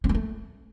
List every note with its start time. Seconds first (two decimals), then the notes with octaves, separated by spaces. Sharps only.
0.04 C4
0.09 G#3
0.15 A3